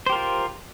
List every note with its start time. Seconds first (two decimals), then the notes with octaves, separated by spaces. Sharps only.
0.06 C5
0.09 G4
0.13 A#4
0.16 F4